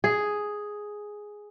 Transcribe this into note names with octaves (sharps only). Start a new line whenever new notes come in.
G#4